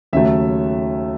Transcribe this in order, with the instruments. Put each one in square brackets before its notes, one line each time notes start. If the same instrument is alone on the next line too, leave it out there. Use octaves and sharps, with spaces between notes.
[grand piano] D#2 C#3 F#3 A3 E5